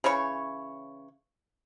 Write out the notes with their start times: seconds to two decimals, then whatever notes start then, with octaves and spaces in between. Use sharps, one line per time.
0.04 C#3 E3 C#5 C#6